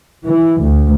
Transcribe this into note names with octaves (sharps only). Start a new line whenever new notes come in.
E3
D2